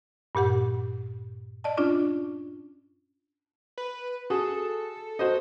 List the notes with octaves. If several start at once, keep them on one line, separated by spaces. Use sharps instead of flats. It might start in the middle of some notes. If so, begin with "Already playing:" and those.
G2 A#2 G4 F#5
D5 D#5 A5
C#4 D4 F4 D5
B4
F#4 G#4 A4
F#4 C5 D#5